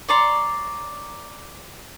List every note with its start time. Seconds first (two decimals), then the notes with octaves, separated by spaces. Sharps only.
0.09 C#5 D5 A#5 C6